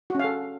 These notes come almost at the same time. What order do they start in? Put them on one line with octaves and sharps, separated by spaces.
F#4 C#4 F5 A4